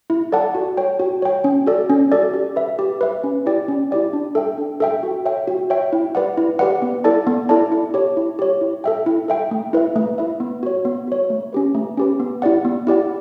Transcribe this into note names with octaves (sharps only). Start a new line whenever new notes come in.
E4
A4 D5 F#5 A5
F#4
C#5 G5
F#4
C#5 G5
C#4
F#4 A4 D5
C#4
F#4 A4 D5
G4
B4 E5
G4
B4 E5
C#4
E4 G4 D5 G5
C#4
E4 G4 D5 G5
D4
A4 E5 G5
D4
A4 E5 G5
F#4
C#5 E5 G5
F#4
C#5 E5 G5
E4
G4 B4 D5 F#5
E4
G4 B4 D5 F#5
B3
E4 A4 D5 A5
B3
E4 A4 D5 A5
E4
G4 C#5
E4
G4 C#5
E4
A4 E5 G5
E4
A4 E5 G5
A3
E4 B4 E5
A3
E4 B4 E5
B3
F#4 C#5
B3
F#4 C#5
A3
C#4 G4 B4
A3
C#4 G4 B4
B3
E4 G4 D5 F#5
B3
E4 G4 D5 F#5